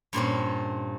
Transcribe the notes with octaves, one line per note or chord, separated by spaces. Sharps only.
G2 A#2 C4 C#4